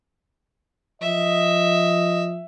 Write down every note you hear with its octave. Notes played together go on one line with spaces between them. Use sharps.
F3 D#5 E5